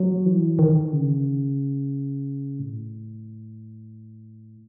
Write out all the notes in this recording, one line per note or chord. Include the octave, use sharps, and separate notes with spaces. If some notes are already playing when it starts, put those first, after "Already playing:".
Already playing: F#3
E3
D#3
C#3
A2